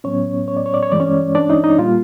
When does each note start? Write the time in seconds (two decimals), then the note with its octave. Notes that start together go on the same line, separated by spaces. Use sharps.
0.04 A2 F#3 B3 C#4 C#5
0.48 C#5
0.57 D5
0.66 C#5
0.74 D5
0.83 C#5
0.92 G2 E3 G#3 D5
1.00 C#4 C#5
1.35 D4 D5
1.50 D#4 D#5
1.64 D#4 D#5
1.78 A#2 G3 A#3 F4 F5